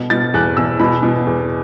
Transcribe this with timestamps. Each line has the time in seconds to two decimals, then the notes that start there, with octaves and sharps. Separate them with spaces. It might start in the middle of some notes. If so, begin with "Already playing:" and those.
Already playing: B2
0.10 B2 A6
0.34 E2 F#6
0.57 E2 E6
0.80 B2 B5
1.03 B2
1.27 E2